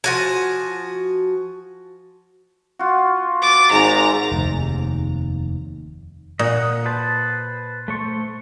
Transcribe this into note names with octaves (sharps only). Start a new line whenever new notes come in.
F3 F#4 G#5
F4 F#4
D6 A6
G#1 G#2 A#5
F1 D#2
A#2 D#5 F#5
B4 C5 A5
A3 C5 C#6